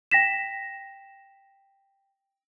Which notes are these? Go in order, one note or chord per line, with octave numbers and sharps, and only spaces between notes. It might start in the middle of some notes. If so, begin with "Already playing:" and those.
G5 A#6 B6 E7